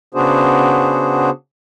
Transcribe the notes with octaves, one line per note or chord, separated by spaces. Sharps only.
C#3 B3 D4 F#4 G#4 C5